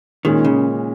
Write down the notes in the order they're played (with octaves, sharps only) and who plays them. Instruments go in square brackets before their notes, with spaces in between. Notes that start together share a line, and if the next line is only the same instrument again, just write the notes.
[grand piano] A#2 G#3 C#4 [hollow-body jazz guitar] D#3
[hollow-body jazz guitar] C#3